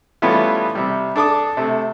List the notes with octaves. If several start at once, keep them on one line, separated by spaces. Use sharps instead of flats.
E3 G3 A3 B3 C#4 F4
C3 G3
D4 A4 D6 D#6
C3 A3